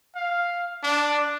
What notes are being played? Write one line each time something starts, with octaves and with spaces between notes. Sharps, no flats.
F5
D4